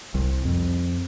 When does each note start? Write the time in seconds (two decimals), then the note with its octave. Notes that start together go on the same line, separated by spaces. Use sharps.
0.14 C2
0.45 F2